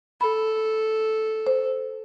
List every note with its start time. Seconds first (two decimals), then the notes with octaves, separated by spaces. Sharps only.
0.21 A4 B5
1.47 C5